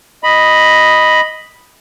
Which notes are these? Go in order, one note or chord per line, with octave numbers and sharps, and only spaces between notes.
D#5 B5